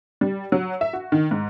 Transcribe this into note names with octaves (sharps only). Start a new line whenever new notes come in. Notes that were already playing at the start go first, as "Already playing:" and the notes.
G3
F#3
E5
F#4
D#3
G#2